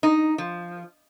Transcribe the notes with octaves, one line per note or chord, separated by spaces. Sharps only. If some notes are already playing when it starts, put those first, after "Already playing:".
D#4
F3